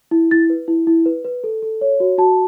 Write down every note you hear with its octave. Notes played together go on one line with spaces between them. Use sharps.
E4
E4 A6
B4
E4
E4
B4
B4
A4
A4
C#5
F#4
F#4 A5